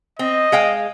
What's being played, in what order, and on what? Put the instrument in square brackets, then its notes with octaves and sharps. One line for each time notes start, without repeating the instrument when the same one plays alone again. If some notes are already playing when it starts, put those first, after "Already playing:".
[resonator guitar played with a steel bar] C4 [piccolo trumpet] D#5
[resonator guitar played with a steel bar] G#3 F5 G5